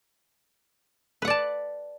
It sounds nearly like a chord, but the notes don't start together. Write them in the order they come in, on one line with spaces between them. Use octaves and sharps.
B4 F#5 D5 A5